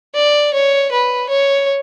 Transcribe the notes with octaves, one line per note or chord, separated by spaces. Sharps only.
D5
C#5
B4
C#5